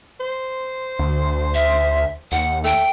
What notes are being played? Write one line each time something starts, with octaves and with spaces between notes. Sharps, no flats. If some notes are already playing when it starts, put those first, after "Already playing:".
C5
D2
E5
D#2 F#5
A3 G5